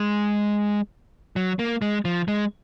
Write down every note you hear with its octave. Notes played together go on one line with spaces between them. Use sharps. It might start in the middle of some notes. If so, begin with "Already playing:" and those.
Already playing: G#3
F#3
A#3
G#3
F3
G#3